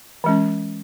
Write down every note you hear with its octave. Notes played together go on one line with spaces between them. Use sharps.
E3 G#3 C#4